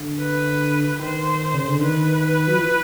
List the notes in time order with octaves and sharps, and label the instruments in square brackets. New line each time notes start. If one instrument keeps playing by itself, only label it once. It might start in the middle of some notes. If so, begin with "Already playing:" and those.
Already playing: [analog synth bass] D3
[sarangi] B4
[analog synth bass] D#3 [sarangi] C5
[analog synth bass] C#3
D3
[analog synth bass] D#3 [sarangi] B4
[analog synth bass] F#3
F3
E3